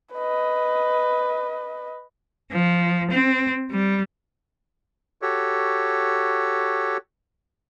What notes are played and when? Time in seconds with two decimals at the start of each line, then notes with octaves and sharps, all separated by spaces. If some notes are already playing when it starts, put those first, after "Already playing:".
0.14 B4 D#5
2.51 F3
3.11 C4
3.71 G3
5.22 F#4 G4 A4 C#5